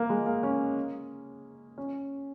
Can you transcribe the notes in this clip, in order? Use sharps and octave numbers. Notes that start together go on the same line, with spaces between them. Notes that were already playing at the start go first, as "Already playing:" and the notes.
Already playing: A#3
G#3
A#3
C#4
C#4